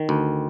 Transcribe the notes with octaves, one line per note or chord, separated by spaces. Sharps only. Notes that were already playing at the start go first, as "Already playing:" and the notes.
Already playing: D#3
D2